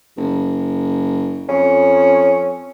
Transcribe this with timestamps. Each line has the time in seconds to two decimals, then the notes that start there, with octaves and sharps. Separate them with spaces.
0.17 F#1
1.49 F2 C#4